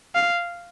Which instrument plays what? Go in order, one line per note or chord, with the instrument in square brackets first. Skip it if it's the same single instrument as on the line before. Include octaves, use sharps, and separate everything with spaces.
[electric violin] F5